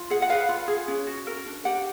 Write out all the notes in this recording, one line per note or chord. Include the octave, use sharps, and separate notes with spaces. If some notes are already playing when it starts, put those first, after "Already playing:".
Already playing: F4
G#4 F#5
F#5
B4 F5
F4
G#4
C#4
F#4
A#4
D4
G4 F#5